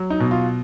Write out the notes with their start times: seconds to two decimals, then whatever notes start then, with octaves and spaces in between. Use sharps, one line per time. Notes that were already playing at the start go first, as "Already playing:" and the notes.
Already playing: F#3
0.10 D#4
0.20 B2
0.31 F4